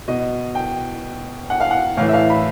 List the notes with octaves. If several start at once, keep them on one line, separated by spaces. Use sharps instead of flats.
B2 D#5
G5
F#5
F5
F#5
A2 E3 F5
E5
F5
B5